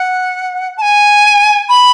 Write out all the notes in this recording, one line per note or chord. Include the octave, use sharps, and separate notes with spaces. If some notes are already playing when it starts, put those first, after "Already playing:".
Already playing: F#5
A5
G#5
B5